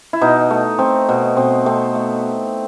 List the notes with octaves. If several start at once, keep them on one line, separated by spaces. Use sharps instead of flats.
E4
B2 D#4
A3
A3 C4
B2
B2 C4
A3 C4
A3